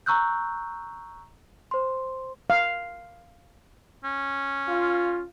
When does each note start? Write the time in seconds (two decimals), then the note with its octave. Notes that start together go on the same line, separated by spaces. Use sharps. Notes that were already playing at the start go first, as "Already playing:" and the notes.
0.06 A#5 C#6 E6 F#6 G6
1.71 C5 C6
2.50 F5
4.04 C#4
4.69 F4